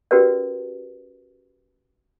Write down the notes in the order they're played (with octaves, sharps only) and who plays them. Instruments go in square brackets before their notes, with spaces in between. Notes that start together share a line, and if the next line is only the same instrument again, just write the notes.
[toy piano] C#4 F#4 G4 A#4 B4 D5